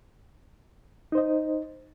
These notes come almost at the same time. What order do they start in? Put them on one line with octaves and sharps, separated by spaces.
D#4 C5 D#5